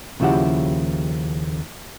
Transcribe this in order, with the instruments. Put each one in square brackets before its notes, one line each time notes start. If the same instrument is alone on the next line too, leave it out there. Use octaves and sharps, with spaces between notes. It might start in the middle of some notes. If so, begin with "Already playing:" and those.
[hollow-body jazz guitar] D#2 C#3 F3 E4 G4 F#5